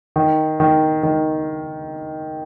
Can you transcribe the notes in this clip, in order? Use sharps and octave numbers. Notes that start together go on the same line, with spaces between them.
D#3
D#3
D#3